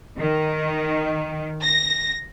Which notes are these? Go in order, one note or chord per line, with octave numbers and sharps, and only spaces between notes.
D#3
A#6